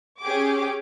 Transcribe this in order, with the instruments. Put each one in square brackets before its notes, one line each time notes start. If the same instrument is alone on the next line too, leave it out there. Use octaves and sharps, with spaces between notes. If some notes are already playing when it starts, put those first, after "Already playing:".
[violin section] C#4 G4 G#4 D6